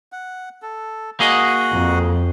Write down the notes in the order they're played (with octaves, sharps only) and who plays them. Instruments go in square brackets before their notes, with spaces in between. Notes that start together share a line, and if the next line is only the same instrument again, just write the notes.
[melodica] F#5
A4
[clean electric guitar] A#3 G#4 D#5 [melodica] F#4 F#5
[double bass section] F2